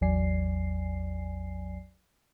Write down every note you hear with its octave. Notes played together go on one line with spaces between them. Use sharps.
A1 E2 F#3 D5 G#5 C7